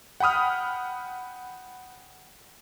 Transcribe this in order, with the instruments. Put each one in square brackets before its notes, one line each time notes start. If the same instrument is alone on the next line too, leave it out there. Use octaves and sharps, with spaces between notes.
[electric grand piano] F#5 G5 B5 D#6 F6